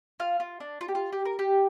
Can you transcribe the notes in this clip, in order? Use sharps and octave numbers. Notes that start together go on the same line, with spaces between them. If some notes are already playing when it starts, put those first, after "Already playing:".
F4 F5
F4
D4
F4
G4
F4
G4
A#4
G4